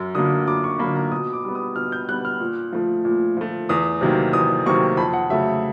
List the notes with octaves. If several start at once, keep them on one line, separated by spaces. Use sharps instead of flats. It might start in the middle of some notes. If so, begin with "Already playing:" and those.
Already playing: F#2
D3 F#3 A#3 D#6
F#2 D6
C#6
D3 F#3 A#3 B5
A#5
B2 D#6
D6
G3 B3
D#6
B2 F6
G6
G3 B3 F#6
F6
A#2
F3 A3
A#2
F3 A3
E2 D#6
C3 D#3 F#3 A#3
E2 D#6
C3 D#3 F#3 A#3 C#6
F2 B5
F#5
C#3 F#3 A3 E5